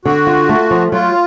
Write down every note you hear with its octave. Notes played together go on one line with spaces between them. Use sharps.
D3 F#4
F4
A3
F3
F#3 F4